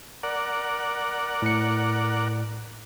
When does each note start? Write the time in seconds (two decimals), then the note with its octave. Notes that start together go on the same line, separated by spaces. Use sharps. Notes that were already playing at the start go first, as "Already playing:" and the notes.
0.23 A#4 D5 F#5
1.42 A2 C#7